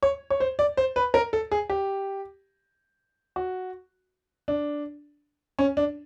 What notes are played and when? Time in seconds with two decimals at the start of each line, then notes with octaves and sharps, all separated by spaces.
0.03 C#5
0.30 C#5
0.40 C5
0.59 D5
0.77 C5
0.96 B4
1.14 A#4
1.33 A4
1.51 G#4
1.70 G4
3.36 F#4
4.48 D4
5.59 C#4
5.77 D4